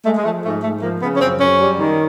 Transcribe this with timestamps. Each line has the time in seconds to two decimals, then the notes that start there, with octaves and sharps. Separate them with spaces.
0.04 G#3 A3
0.17 G#3
0.24 F3 A3
0.43 G#2 A3
0.62 G#2 A3
0.81 F3 A#3
1.01 C#3 B3
1.13 C#4
1.20 F#2 C4
1.39 F#2 C#4
1.59 G3
1.79 D#3